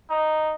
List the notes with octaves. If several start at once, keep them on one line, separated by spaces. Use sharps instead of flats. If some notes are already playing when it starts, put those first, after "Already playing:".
D#4